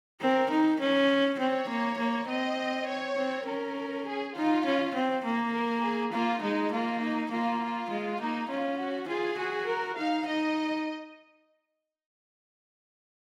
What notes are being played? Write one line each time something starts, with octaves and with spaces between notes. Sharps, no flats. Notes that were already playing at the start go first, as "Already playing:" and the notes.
C4 A#4
D#4
C#4
C4 C#5
A#3
A#3
C4 D#5
C#5
C4
C#4 A#4
G#4
D#4 F4
C#4
C4
A#3
A#4
G#4
A#3 F4
G#3 D#4
A#3 F4
D#4
A#3 F4
F4
G#3
A#3 D#4
C#4 F4
F#4
F4 G#4
F#4
A#4
D#4 F5
D#4 D#5